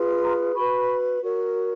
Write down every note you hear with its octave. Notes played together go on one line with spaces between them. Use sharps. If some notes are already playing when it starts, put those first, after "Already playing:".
Already playing: F4 G#4 B4
A#5 C6
F#4 B4 B5 C#6
F#4 A#4 C#5